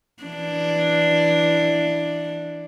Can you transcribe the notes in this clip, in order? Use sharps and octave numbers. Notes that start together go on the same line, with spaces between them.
E3 D4